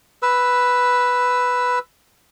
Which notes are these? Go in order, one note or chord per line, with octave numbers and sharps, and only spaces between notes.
B4 E6